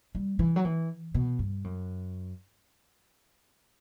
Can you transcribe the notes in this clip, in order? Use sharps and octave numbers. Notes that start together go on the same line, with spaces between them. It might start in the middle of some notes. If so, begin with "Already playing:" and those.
G3
E3
F#3
E3
B2
G2
F#2